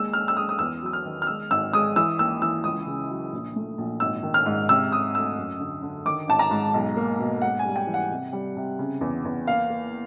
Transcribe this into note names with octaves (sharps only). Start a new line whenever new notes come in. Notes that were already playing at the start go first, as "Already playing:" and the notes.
Already playing: D#2 G#3 E6
G#3 F6
E6
G#3 D#6
D#6
E2 E6
F#3 E6
F6
D#3
F6
G#3 E6
G#1 E6
G#3 D#6
E3 E6
D#2 E6
E3 E6
C#2 D#6
C#3
F#3
A#1
A3
A#1
G#1 E6
D#3
F6
G#2
C3 E6
C3 D#6
D2 E6
F#2
D3
D3
D#3 D6
G#1 A5
A#5
G#2
B1
A#3
B2
G#2 F#5
G#5
G3
G5
E3
F#5
C3
G3
C3
C#3
E2
E2
A#3 F5
A#3